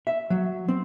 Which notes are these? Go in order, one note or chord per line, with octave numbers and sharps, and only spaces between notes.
E5
F#3
C4